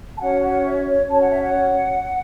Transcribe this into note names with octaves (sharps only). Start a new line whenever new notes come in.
A5
C#4 F#4 C#5 F#5
F#5
E5
C#5
C#4 F#4 C#5 A5
F#5
E5
F#5